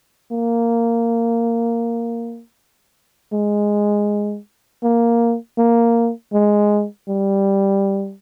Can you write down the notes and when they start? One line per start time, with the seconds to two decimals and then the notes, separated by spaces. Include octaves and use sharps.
0.32 A#3
3.33 G#3
4.83 A#3
5.58 A#3
6.33 G#3
7.08 G3